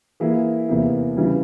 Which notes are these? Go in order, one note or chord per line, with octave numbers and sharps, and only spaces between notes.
E3 A#3 E4 G#4
E2 C3 E3 A#3
C#3 E3 G3